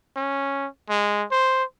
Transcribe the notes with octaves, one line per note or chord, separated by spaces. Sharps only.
C#4
G#3
C5